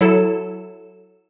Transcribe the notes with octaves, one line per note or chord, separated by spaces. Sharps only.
F#3 E4 A4 E7